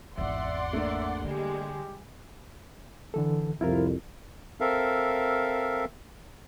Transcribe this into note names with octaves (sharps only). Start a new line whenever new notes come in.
G#1 E2 D5 E5 F#5 C6
A3 A#3 D4 E5
D3 G3 G#3 G4
D3 E3 A4
C2 F2 E4 F4 A#4
C4 A4 A#4 E5 F5